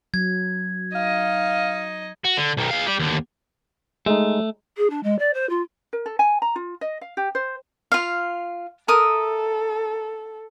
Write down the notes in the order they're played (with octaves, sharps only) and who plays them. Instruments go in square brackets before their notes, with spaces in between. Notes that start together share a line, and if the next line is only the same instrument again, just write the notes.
[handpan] F#3 [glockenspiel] G#6
[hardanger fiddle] D#4 D#5 [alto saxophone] F5
[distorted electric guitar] F#4
D3
B1 D#3
G#3 F5
G4 D5
D#2 D3
[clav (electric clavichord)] G#3 D#4 [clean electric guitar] A3
[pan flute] G#4
D4
G#3
D5
C5
F4
[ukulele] A#4
A4
G#5
A#5
F4
D#5
F5
G4
C5
[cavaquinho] F4 F5
[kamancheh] A4 [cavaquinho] A#4 E5 D#6